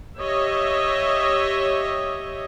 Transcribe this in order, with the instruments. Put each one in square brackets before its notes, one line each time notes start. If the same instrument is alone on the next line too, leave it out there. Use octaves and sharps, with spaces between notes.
[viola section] G4 C#5 D#5 E5